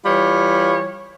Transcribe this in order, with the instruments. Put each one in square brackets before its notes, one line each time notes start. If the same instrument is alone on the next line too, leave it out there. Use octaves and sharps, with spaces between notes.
[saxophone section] E3 G3 F4 C#5